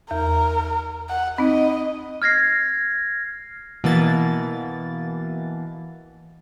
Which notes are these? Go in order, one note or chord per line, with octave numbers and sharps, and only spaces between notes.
E2 A#4
F#5
C4 D#4 D#5
F6 G#6 A#6 C7
B2 E3 A#3 A6